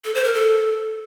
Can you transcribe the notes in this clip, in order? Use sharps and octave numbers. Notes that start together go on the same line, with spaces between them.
A4
C5
A#4
A4